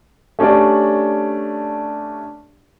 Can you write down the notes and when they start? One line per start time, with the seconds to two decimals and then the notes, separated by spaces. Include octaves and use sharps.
0.39 A3 C#4 D4 G4 D5